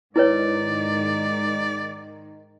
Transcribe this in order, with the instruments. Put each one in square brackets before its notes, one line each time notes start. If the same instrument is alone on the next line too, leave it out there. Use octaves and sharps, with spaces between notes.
[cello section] G#2 D#3 [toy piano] E4 B4 C#5 [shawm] D5